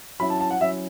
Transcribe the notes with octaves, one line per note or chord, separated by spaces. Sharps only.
F#3 C#4 E4 B5
A5
A5
F#5
F#3 C#4 E4 E5